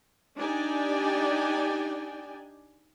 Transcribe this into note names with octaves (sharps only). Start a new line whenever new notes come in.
D4 D#4 G4 D5 G5 G#5